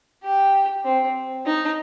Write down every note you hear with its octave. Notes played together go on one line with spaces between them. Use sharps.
G4
C4
D#4